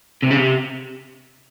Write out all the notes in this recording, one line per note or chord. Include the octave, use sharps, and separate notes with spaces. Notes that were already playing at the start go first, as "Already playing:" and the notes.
C3
C#3
C3